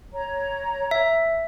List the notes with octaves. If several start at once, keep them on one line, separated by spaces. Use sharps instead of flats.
C#5 A#5
E5